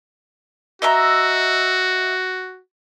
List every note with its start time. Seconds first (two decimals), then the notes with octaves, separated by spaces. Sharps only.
0.82 F#4 D#5 E5 A#5